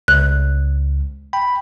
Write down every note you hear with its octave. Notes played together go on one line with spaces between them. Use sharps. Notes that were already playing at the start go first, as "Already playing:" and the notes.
C#2 F#6
G5 B5